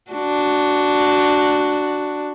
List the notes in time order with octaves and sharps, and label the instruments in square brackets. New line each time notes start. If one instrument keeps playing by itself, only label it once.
[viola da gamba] D4 F#4